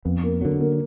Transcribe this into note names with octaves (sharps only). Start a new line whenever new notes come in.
F2 B3
A#3
D3 F#3 A#3
A#3